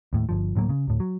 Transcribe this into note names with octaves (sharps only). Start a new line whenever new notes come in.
D#2 A2
G1 F3
D1 A2 F#3 A#3
C#3
D2 A2
F#3